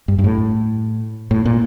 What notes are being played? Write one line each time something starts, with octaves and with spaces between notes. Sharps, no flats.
G2
G2
A2
A2
A#2